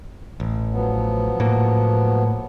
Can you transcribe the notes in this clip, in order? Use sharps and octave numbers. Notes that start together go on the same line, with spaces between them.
A1
F3 F#3 B3
A2 A#3